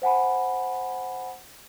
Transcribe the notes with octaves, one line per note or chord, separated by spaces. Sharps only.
C5 F#5 G#5 B5